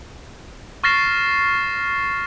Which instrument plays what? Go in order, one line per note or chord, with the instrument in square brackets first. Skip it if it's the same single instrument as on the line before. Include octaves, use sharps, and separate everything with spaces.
[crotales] C#6 F6 A6 A#6 C7 E7